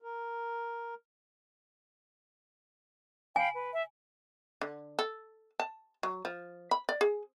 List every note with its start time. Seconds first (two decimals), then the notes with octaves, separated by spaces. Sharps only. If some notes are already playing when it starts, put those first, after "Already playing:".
0.02 A#4
3.36 F5 G5 G#5 B5
3.55 B4
3.73 E5
4.61 D3
4.99 A4
5.60 A5
6.03 F#3
6.25 F3
6.71 B5
6.89 D5
7.01 G#4